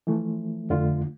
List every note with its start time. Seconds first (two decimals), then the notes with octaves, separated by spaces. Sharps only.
0.07 E3 F3 A3
0.70 F2 D3 A3 F4